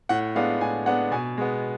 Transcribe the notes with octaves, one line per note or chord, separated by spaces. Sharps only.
A2 F#5
G#3 B3 D4 F5
A2 G#5
G#3 B3 D4 F#5
B2 G#5
G#3 B3